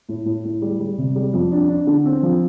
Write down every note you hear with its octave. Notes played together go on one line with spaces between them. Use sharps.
A2
A2
A2
G3
G3
C3
G3
F2
D4
D4
D3
C4
F3